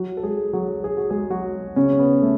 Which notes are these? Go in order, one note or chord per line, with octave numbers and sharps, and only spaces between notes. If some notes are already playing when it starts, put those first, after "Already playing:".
Already playing: F#3 F#4
A4
G#3 G#4
F#3 F#4
G#4
F#4
G#3 G#4
F#3 F#4
C#3 C#4
C#4
B3
A3